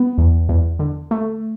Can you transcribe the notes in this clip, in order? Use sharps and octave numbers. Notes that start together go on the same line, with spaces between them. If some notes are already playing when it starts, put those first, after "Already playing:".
Already playing: B3
E2
E2
D3
A3